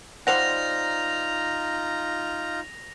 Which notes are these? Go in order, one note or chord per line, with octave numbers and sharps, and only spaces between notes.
G3 D#4 F4 C5 F#5 A#5 A#6 F7